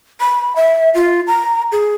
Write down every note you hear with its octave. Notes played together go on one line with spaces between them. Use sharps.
B5
E5
F4
A#5
G#4